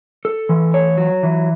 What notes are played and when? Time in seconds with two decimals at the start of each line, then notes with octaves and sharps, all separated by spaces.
0.25 A4
0.49 E3
0.74 C#5
0.98 F#3
1.23 E3